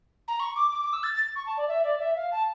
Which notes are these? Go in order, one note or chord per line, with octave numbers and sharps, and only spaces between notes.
A#5
C#6
D6
D6
D6
E6
A6
A6
C#6
A5
D5
E5
D5
E5
F5
A5